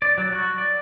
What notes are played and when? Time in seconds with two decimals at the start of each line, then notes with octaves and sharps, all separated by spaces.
0.02 D5
0.18 F#3
0.32 F#4
0.58 D5